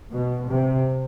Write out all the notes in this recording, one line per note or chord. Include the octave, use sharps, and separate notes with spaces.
B2
C3